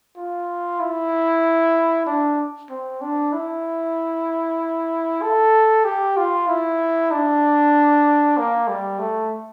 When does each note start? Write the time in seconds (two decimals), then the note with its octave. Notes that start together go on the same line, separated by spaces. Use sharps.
0.17 F4
0.80 E4
2.06 D4
2.70 C4
3.01 D4
3.33 E4
5.22 A4
5.85 G4
6.17 F4
6.48 E4
7.11 D4
8.37 A#3
8.68 G3
8.99 A3